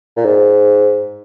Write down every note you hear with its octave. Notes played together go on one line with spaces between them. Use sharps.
A#2
G#2